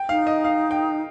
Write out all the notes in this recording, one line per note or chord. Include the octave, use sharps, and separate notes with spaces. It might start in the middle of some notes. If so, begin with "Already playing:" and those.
Already playing: G5
D#4 F5
D#5
F5
G5